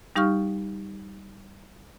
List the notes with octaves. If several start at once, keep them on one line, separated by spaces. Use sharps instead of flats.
G3 D#4 G4 F5 C#6 F6